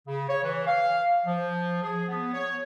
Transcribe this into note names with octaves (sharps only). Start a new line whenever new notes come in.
C#3
C#5
E3
F5
F3
G#4
B3
C#5